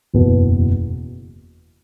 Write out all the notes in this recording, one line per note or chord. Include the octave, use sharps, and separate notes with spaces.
F#1 E2 B2 B3